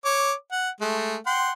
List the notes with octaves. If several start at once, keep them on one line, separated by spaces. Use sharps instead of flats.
C#5 D6
F#5
G#3 A3
F#5 G5 C6